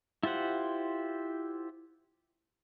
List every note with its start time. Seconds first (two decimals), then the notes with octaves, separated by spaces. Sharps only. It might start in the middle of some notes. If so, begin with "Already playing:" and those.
0.23 E4 F4 G4 C5 F#5